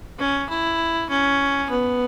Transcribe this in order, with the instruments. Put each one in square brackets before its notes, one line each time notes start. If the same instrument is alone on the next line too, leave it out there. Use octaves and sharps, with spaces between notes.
[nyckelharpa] C#4
E4
C#4
B3